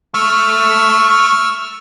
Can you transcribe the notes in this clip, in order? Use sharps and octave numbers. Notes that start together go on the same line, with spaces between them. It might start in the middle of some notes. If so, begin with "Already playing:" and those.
A3 C#6 E6 F6